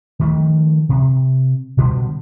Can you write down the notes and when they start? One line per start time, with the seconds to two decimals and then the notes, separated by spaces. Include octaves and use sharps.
0.19 D#3 F3 A3
0.89 C3
1.77 B2 D3 F#3 G3